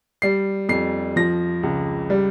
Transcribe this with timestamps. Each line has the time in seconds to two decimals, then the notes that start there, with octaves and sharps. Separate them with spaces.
0.22 G3 C7
0.69 F2 C7
1.16 F3 A#6
1.63 C#2
2.10 G3